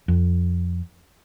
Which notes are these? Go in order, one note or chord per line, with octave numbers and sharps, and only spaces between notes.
F2